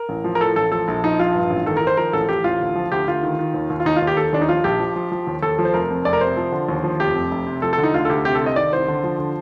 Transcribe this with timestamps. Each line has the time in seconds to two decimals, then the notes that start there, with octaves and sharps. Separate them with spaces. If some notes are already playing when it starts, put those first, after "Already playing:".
Already playing: A#4
0.09 A1
0.24 F3
0.35 A#4
0.40 A2 A4
0.56 A1 A4
0.72 F3 A4
0.88 A#1
1.03 F3 D#4
1.19 A#1 F4
1.35 G2
1.50 A1
1.66 D#3 A4
1.77 A#4
1.82 D#3
1.87 C5
1.97 F3 A#4
2.13 A1 A4
2.29 A1 G4
2.44 A1 F4
2.61 D2
2.75 F3
2.92 D2 G4
3.07 D2 F4
3.23 D#3
3.39 D#3
3.54 D#2
3.70 D#2
3.80 F4
3.85 D#2 D#4
3.97 F4
4.02 D#2
4.07 G4
4.17 D#3 A4
4.33 D#2 D4
4.41 D#4
4.48 F3 F4
4.64 A#1 G4
4.80 F3
4.96 F3
5.12 F3
5.27 D#2
5.42 D#2 A4
5.58 F3
5.65 C5
5.74 F1 A#4
5.90 F2
6.05 F1 D5
6.13 A#4
6.21 C3 C5
6.37 F3
6.52 D3
6.69 D#2
6.84 F3
7.00 F1 G4
7.15 F2
7.31 F1
7.47 C3
7.62 F3 A4
7.73 A4
7.78 D3
7.83 D#4
7.94 D2 F4
8.05 A4
8.10 D2 G4
8.25 C3 G4
8.35 A4
8.41 C2 D#5
8.56 D#3 D5
8.73 C2 C5
8.88 D3
9.04 F3
9.19 D3